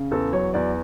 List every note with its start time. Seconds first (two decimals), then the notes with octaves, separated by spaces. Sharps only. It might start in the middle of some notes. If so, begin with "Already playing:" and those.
Already playing: C#3
0.11 E2 A4
0.32 F#3 C#5
0.54 E2 D5